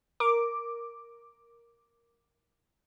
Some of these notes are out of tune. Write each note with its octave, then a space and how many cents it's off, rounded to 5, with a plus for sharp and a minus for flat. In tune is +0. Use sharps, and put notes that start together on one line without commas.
A#4 +0 D6 +0